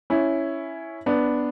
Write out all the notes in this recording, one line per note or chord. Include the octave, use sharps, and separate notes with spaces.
C#4 E4
B3 D4